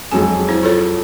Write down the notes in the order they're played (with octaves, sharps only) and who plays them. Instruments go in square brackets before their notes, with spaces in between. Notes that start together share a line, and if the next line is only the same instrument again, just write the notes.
[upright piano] F2 F#3 G#3 [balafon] G#5
[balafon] E4 C5
F4 A4 C#5